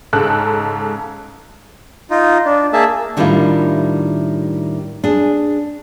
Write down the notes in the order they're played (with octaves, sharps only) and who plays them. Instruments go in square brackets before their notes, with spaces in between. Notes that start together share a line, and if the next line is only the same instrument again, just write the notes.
[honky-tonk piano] G#2 C#3 G#3 A4 F#6
[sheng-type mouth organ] D#4 F4
D4
A#3 G#4 E5 A5
[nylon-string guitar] A2 D#3 G3 D4 E4 F4
D4 G#4